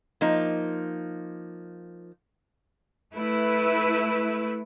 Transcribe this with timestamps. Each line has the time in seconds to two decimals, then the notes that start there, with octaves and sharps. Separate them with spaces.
0.21 F3 A#3 D#4
3.13 A3 E4 B4